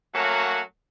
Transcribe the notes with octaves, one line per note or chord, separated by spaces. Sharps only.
F#3 A3 A#3 C#4 F#4